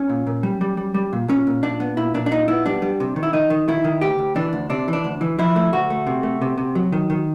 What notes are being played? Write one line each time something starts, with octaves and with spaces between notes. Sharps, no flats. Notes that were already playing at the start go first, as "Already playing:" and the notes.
Already playing: C#4
A#2
A#2
G3
G3
G3
G3
A#2
A#2 C#4
A#2
A#2 D4
B3
A#2 E4
A#2 D4
D4
A#2 D#4
B3 E4
G3 D4
G3
C3
D#3
E4
D#3 D#4
D#3
D#3 E4
D#3
D2 G4
D2
E3 D4
D2
C3 D4
E3 D4
D2
E3
F3 E4
A3
D2 F#4
A3
C3
A3
C3
C3
F#3
D#3
D#3